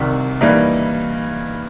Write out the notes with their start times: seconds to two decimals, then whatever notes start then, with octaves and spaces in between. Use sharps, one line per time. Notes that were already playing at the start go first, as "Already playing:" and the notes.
Already playing: C2 C3 D#3
0.41 G2 E3 G3 A#3 D#4